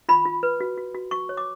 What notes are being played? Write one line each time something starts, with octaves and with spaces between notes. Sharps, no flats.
F4 B5
F4
B4
F#4
F#4
F#4
F#4 C#6
C#5
D6